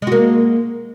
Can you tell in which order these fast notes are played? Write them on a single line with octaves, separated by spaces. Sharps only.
G#3 F#4 A#3